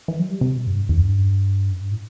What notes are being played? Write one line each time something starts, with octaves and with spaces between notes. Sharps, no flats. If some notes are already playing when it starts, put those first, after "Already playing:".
E3
F#3
G3
C3
B2
F#2
G2
E2
F#2
G2
F#2
G2
A2